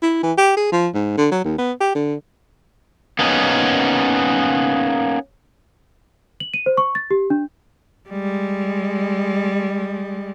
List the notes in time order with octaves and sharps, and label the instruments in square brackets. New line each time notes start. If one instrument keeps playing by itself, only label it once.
[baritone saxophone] E4
E3
G4
G#4
F3
G#2
D3
F#3
D#2
B3
G4
D3
[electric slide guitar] A#3 B3 C#4 D#4
[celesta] F#7
D#7
C5
C#6
A6
G4
D4
[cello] G3 G#3